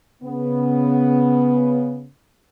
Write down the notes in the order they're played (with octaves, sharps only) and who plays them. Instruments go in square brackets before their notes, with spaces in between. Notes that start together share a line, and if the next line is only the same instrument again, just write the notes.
[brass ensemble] C#3 B3